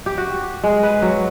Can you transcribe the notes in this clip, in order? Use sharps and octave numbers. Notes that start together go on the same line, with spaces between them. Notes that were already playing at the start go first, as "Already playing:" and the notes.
G4
F#4
G#3
B4
F#3